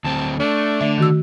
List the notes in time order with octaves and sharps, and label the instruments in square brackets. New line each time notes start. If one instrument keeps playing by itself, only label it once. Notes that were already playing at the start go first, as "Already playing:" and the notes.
[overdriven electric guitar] D2 C4 [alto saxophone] A5
[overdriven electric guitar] A3 [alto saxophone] D4
[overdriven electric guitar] D3 [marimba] A3 E5
[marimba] D#3 F#4 E6